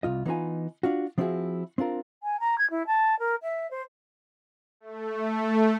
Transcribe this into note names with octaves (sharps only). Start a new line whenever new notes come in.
C2 F2 F4 D#5
E3 B3 D#4 F4 G#5
D4 F4 F#4
F3 C4 C#4 E4 F#4 G#4
C4 D4 F4 A#4
G#5
A#5
G#6
E4
A5
A#4
E5
C5
A3